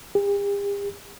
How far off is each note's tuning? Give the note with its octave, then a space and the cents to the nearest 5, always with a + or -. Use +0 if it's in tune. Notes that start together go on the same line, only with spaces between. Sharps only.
G4 +45